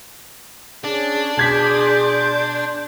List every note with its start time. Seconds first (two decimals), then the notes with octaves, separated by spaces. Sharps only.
0.84 C#4 D4 G#4
1.37 B2 G#4 C6 G6 G#6 B6